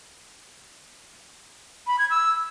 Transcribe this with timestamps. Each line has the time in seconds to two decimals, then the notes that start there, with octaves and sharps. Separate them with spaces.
1.87 B5
1.99 G#6
2.10 E6